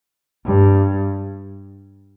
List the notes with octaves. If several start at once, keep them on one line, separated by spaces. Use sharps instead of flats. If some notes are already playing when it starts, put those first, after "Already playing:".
G2